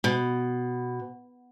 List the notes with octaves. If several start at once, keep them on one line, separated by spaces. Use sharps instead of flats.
B2